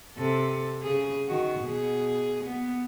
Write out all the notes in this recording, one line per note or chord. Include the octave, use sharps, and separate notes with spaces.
C3 A4
C#3 G#4
D#3 F#4
B2 G#4
B3